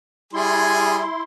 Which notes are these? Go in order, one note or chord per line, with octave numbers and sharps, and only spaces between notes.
G3 E4 G#4 G#5 C6